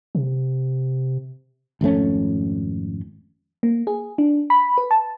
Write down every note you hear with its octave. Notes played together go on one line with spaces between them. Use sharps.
C3
G#1 F2 A3 C#4
A#3
G#4
D4
B5
B4
A5